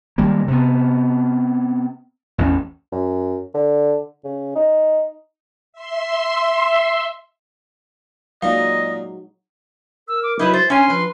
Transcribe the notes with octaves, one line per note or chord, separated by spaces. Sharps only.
D#3 G3 G#3 A#3
C3 B3
A1 E2 E3 C#4
F#2
D3
C#3
D#4
E5 C6
A#2 F#3 G#3 D#4 D#5 F5
A#4 E6
D6
F#3 D#4 E4 B4 B5
C5 A6
C#4 C#5 G#5 C6
F3 B4